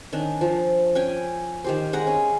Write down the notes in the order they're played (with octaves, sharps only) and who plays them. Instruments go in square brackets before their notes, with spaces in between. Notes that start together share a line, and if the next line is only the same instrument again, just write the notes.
[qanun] D#3 C#4 D4
F3
C#4 G5 G#5
D#3 G4 C5
G#3 F#5 A#5
C#4